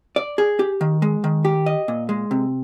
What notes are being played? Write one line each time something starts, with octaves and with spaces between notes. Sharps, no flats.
D5
G#4
G4
D#3
G#3
D#3
G4
D#5
A#2
G#3
C3